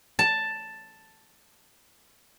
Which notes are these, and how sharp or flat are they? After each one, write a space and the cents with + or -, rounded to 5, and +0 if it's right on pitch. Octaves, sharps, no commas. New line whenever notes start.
A5 +5